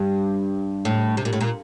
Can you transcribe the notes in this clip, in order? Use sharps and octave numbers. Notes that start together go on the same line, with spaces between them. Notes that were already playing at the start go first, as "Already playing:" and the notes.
Already playing: G2
A2
C3
A#2
A2
A#2